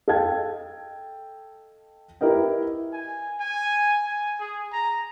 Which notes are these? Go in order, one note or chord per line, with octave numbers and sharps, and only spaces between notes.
A4 D#5 F5 G5 A5 G#6
E4 G4 A#4 B4 D#5 G5
G#5
G#5
G#5
G#4
A#5